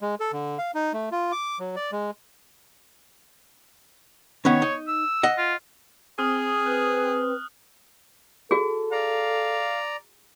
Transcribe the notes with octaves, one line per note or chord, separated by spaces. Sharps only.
G#3
A4
D3
F5
D#4
A3
F4
D6
F#3
D5
G#3
D#3 B3 C#4 C#5
D#4
E6
D#5 F#5
F4
C4 G#4 D#6 F6
B4 F#6
F#4 G#4 A4
D5 F5 A#5